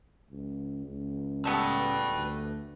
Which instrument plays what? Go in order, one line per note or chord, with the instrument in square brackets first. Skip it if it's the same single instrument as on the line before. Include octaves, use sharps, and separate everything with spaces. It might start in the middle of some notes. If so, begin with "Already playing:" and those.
[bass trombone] C#2
C#2
[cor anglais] G3 [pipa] A3 B3 [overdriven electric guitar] B4 A5
[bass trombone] D2